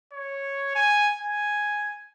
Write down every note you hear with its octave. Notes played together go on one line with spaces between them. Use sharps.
C#5
G#5
G#5